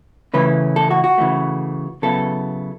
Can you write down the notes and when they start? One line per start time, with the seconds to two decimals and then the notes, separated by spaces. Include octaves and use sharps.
0.34 C#3 E3 A3 C#4 E4 B4
0.76 A4
0.91 F#4
1.04 F#4
1.18 C#3 E3 A3
2.02 C#3 F#3 B3 E4 A4